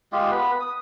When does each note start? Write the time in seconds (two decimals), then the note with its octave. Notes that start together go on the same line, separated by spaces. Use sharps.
0.12 G#3 F4 G4
0.31 B3 B4
0.60 D#6